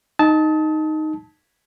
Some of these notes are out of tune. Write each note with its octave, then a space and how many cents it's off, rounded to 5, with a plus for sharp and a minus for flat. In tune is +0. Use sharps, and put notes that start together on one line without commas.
D#4 +0 A5 -10 D#6 +35